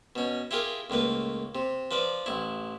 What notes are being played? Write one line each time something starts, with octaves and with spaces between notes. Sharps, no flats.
B2 C#4
E4 F4 G4 G#4 A#4
C#2 A2 A#3 B4
C3
F3 B4 D5
A1 E4